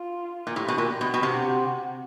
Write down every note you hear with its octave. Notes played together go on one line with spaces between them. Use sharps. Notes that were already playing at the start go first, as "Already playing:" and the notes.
Already playing: F4
A#2
A2 G4
B2
A#2
B2
B2
C3 F#4